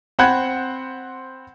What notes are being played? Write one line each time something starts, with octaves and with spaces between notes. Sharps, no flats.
C4 C5 F#5 B5 F#6 G#6